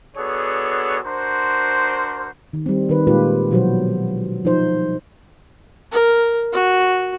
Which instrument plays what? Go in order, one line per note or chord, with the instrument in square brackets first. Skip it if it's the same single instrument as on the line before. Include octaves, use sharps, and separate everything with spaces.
[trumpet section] B3 D4 F#4 G#4 A4 C#5
D4 F#4 A#4 C5
[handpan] D#3
G3 C4
D#3 B4
A#2 G#3 F4 G4 B4
B2 F3 F#3 F#4 C5
F3 D#4 C5
[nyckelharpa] A#4
F#4